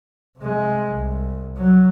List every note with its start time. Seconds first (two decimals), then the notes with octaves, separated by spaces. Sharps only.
0.38 C3 G#3
0.92 C2
1.57 F#3